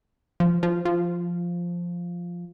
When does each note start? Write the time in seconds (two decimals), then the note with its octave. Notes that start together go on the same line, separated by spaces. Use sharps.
0.40 F3
0.63 F3
0.85 F3